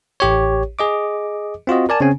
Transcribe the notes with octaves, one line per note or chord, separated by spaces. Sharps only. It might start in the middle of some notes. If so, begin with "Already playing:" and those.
A1 G4 C#5
G#4 D#5 D6
C4 F4 F#4 D#5
A#4 D5 G#5 A5
C#3 C4 C#4 G#5